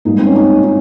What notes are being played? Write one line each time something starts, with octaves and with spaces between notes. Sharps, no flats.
G#2 G3 A#3 D#4
C4
C#4
D#4
D#4